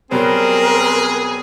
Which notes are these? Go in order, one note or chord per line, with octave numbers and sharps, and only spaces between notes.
B2 F#3 G3 C4 G#4 A#4